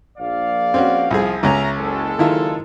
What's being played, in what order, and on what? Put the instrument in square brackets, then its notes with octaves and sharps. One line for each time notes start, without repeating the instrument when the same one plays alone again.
[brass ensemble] A#1 D5 F5
[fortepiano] C4 C#4 F#4
[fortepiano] C2 G#4 [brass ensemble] F3
[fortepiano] C#2 C#3 C#4 [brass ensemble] E5 A#5
[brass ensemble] F#1 G#3 A4
[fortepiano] D#3 E4 F4